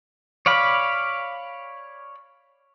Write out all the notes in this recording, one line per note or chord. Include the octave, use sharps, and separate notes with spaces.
C#5 D5 F5 B5